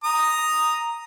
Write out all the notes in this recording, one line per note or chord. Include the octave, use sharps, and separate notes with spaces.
A#5 D#6